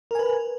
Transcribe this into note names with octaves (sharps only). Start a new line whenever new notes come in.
A#4 B4 G#5